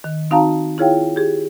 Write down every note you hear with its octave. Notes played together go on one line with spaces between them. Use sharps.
D#3
C4 D#4 F#4 F5 A5 A#5
E4 F4 G#4 C#5 F5 G5
G4 G#4